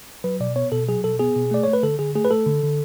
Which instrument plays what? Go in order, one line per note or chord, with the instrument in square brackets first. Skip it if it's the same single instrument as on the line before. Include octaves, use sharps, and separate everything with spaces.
[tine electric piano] F#3 B4
B2 D5
B3 C#5
B2 A4
F#3 G#4
B2 A4
B3 G#4
B2
A3 D5
A3 C#5
B4
D3 A4
D3 G#4
A3 G#4
B4
A3 A4
D3
D3